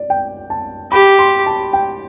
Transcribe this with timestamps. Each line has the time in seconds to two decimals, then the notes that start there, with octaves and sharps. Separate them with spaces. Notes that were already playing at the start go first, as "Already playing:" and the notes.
Already playing: D5
0.10 G5
0.50 A5
0.92 G4 B5
1.19 C6
1.46 A5
1.73 G5